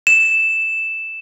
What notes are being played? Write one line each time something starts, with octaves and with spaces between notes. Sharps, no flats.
E7